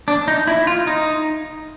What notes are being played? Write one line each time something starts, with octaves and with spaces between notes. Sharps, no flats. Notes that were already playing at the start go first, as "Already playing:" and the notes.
D4
D#4
E4
F4
D#4